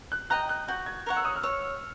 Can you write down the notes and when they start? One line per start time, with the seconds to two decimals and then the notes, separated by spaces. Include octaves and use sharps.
0.12 F#6
0.30 D#5 G5 A#5 F#6
0.49 F#6
0.68 F#4 G6
0.86 G#6
1.06 A#4 C#5 F#5
1.17 E6
1.25 D#6
1.36 F6
1.43 C#5 E6